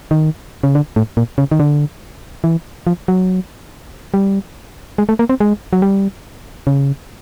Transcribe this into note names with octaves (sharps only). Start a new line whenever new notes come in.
D#3
C#3
D3
A2
A#2
C#3
D#3
D3
E3
F3
F#3
G3
G#3
A3
A#3
C4
G#3
F#3
G3
C#3